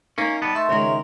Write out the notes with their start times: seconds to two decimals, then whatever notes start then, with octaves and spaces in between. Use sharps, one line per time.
0.18 A#3 C#4 D#4
0.42 G3 B3 A5
0.55 A3 E5 C6
0.69 C#2 D#3 G#3 A#4 C#5